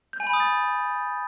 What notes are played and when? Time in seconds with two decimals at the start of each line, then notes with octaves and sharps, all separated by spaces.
0.13 G6
0.20 G#5
0.27 B5
0.33 D#6
0.40 A6